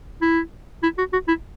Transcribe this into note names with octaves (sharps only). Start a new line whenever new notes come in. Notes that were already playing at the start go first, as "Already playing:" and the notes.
E4
E4
F#4
F#4
E4